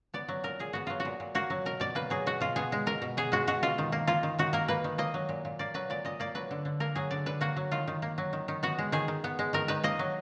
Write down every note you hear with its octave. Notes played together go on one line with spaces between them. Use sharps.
B3 D5
F#3
A#2 A#4
A#2 G#4
B3 F#4
F#3 F4
F#4
A#2
A#2
A#3 F#4
F#3
B2 A#4
B2 D5
A#3 B4
F#3 G#4
B2 F#4
B2 F4
B3 G#4
G#3
B2 A#4
B2
B3 G#4
G#3 F#4
B2 F#4
B2 F4
D#3
A#3
A#3 F4
D#3
D#3 F#4
A#3 A#4
A#3 B4
D#3
A#3 D#5
F#3
A#2
A#2
A#3 D5
F#3 B4
A#2 D5
A#2 D#5
A#3 D5
F#3 B4
D3
D3
A#3 A#4
F#3 G#4
D3 D5
D3 B4
A#3 F#4
F#3
D#3 F4
D#3
A#3
F#3
D#3
D#3
B3 F#4
G#3
D#3 G#4
D#3
B3
G#3
D#3 A#4
D#3 B4
A#3 D#5
F#3